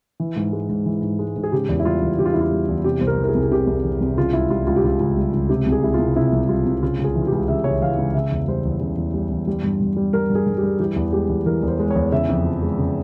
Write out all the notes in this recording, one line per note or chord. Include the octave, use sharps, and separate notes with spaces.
E3
G#2
G#3
G#2
E3
G#2
G#3
G#2
G#4
C#3 G4
E2
E4
G3 F4
E2
C#3 G4
F4
E2 E4
F4
G3
E2
C3 G4
C2 C5
A#4
E3
A#4
G#4
C2
G#4
C3 G4
C2
E3
C2
C#3 F4
C#2 E4
G3 F4
C#2 F4
G4
C#3 F4
C#2
G3
C#2
C3 G4
C2
G#4
G3 E4
F4
C2
C3 E4
C2
G3 F4
C2
C#3 F4
C#2
G#4
E3
F4
G4
C#2
C#3 E5
C#2 C#5
E5
E3 F5
C#2
C#3 E5
E2
G3 C5
E2
C#3
E2
G3
E2
G3
G2
G2
G3
G3 A#4
G2
G#4
G2
G4
G3
E3 G4
E2
G#3 G4
E2
E3 A#4
E2
C5
G#3
E2 C#5
C#3 E5
F2
F3
G#3
C#3